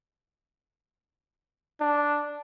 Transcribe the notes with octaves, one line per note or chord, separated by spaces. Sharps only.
D4